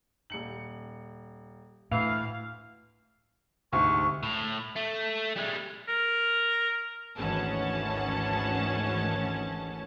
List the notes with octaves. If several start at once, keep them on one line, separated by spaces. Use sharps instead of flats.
D#1 C#7 F#7
D2 A2 E3 F5
D2 G#2 C3 C#6
A2
A3
G3 G#3
A#4
G#1 D2 E3 C#4 F#5 A5